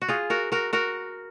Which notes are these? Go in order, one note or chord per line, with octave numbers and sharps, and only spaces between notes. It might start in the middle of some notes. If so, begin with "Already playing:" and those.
F#4
F4 G#4
F#4 A#4
F#4 A#4
F#4 A#4